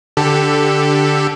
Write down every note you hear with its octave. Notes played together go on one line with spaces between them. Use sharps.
D3 G4 A4